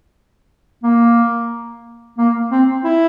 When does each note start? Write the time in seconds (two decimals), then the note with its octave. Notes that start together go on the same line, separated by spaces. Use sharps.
0.83 A#3
2.18 A#3
2.51 C4
2.84 E4